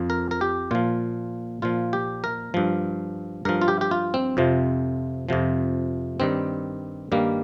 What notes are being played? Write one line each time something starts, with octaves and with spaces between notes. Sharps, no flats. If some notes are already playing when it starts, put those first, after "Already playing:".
Already playing: F2 F3
A#4
A#4
G4
A#2 F3 F4
A#2 F3 F4
G4
A#4
G2 F3
G2 F3 A#4
F4
G4
G4
F4
C4
F2 C3 F3
F2 C3 F3
G2 D#3 G3 C4
G2 D#3 G3 A#3